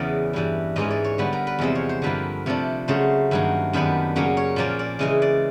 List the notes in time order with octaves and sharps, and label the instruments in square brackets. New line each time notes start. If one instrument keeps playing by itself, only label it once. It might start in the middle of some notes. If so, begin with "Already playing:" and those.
Already playing: [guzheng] E2 C#3 E3 D5
G2 E3 G3
G#2 E3 G#3 C#4 D#5
D5
C#5
D3 G3 B3 B4
A#4
B4
E2 C3 F3 G#3 C5
C#5
C5
G2 D3 F3 A#3 B4
C3 F3 A3 D4
C#3 F#3 A3 C5
G2 D#3 F#3 A#3
F#2 D#3 G3 B3 D4
C#3 F#3 A#3 C#4
C#5
A#2 F3 A#3 C#4 D5
D5
C#3 E3 G#3 D#5
D5